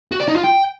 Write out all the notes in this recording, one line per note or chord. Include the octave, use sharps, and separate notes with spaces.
F#4
D5
D#4
F4
G5